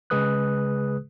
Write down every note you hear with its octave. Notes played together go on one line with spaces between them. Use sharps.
C#3 G#3 G#4 B4 D#6 F#6